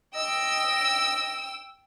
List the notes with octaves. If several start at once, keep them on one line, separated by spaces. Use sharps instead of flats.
D#5 G5 E6